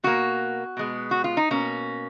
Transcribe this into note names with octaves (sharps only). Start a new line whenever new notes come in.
B2 A#3 F#4
B2 G#3 B3
F#4
F4
D#4
B2 A#3 C#4